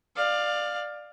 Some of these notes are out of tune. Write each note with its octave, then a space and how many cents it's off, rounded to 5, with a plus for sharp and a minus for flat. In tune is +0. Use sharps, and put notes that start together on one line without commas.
D5 +20 F5 +10